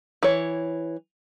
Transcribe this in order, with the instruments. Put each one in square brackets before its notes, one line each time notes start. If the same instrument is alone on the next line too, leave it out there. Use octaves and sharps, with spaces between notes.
[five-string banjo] E3 C#5